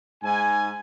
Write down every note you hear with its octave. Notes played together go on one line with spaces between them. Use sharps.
G#2 G#5